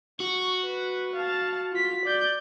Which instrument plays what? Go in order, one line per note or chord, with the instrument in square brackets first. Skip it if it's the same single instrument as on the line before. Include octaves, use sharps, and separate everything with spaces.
[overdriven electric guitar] F#4 [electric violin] C#6
[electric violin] B4
F5 A5
F4 B6
D5 G6